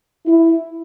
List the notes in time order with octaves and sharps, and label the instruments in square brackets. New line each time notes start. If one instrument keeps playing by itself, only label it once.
[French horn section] E4